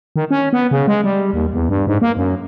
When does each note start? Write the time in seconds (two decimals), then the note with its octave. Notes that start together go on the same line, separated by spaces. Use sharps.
0.16 D#3
0.31 C#4
0.53 B3
0.71 C#3
0.88 G#3
1.04 G3
1.33 D#2
1.53 E2
1.69 G2
1.87 G#2
2.02 A#3
2.17 F#2